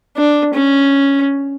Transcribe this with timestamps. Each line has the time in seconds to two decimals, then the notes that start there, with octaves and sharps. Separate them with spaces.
0.17 D4
0.54 C#4